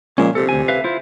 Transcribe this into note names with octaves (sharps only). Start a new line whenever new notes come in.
A#2 F3 G#3 C#4
C3 A4
D2 G#5
B4 E5 F5
E4 F4 C5